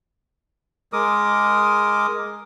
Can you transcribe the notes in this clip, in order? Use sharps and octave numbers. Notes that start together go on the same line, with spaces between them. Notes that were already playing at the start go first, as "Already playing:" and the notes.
G#3 A#4 D6 D#6